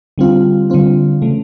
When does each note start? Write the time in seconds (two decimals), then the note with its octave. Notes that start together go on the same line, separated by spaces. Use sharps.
0.18 D3 G3 C4 F4
0.70 D3 G3 C4 F4
1.22 C#3 E3 A3